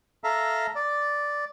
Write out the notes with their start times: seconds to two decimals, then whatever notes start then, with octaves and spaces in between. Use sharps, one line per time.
0.24 A4 E5 F5 A#5
0.75 D5